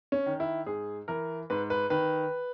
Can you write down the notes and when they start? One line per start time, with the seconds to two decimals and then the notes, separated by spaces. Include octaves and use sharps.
0.12 C#4
0.26 D#3
0.40 E4
0.66 G#2 G#4
1.08 E3 A#4
1.50 G#2 B4
1.70 B4
1.90 D#3 B4